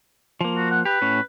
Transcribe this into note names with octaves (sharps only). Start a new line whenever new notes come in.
F3 A#3
F#4
F#5
G4 B4
A2 C#4